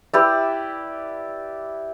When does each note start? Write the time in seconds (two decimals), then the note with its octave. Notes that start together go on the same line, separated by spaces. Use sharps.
0.13 E4 G4 B4 D5